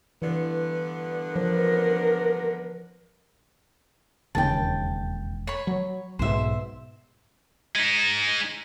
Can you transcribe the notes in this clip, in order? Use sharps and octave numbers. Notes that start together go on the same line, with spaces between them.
G2 D3 E3 B3
F3 A#4
E1 D#2 C#3 G5 A5
C#5 B5
F#3
B1 G#2 B2 C5 E5
G#3 D#4